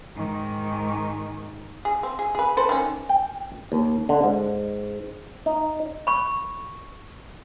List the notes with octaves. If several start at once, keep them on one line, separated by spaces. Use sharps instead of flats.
G#2 D#3
G#4
C4
G#4
G#4 B4
A4 B4 C5
D#3 C#4
G5
D#2
D3
G#2
D#4
B5 C#6